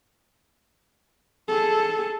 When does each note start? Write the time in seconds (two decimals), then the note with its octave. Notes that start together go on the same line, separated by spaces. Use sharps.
1.49 G#4 A4